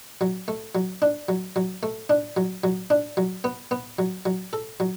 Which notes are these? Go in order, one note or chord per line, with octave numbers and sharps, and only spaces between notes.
F#3
A3
F#3
D4
F#3
F#3
A3
D4
F#3
F#3
D4
F#3
B3
B3
F#3
F#3
A4
F#3